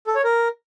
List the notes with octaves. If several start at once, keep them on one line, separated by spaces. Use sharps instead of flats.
A4
C#5
A#4